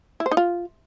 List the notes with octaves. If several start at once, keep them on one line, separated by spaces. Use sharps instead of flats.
E4
C5
D#4
F4